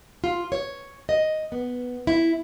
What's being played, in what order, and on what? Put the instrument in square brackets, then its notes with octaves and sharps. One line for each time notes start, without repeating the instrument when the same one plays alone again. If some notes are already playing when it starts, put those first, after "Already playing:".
[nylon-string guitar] F4
C#5
D#5
B3
E4